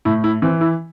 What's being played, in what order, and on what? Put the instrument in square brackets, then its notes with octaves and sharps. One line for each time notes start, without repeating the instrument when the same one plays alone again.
[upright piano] A2 E4
E4
E3 C4
E4